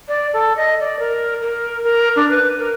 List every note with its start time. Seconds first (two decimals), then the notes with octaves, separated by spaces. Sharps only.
0.08 D5
0.33 A4
0.56 D#5
0.80 D5
0.99 A#4
1.41 A#4
1.84 A#4
2.16 D4
2.30 B4
2.58 A#4